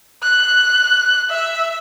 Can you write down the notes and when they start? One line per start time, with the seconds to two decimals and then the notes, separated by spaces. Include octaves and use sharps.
0.23 F#6
1.29 E5